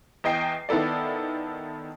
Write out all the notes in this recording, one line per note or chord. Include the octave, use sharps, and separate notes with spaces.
E2 D#5 G5 C7
D#3 B3 E4 A4 D5